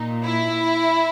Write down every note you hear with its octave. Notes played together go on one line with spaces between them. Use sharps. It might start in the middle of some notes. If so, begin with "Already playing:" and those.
Already playing: A#2 D#4
E4